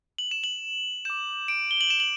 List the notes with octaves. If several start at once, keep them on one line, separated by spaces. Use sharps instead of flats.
F#7
E7
F#7
D6 G6 E7
D7
G7
F#7
E7
F#7